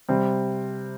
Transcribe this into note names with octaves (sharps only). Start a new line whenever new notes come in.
C3 G3 C4